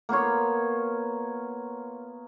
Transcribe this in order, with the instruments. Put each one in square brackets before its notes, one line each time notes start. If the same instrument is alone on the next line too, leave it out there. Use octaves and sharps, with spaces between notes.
[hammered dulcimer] A#3 B3 F4 C#5